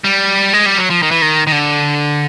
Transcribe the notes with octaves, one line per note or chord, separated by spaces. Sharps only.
G3
G#3
G3
F#3
F3
D#3
E3
D#3
D#3
D3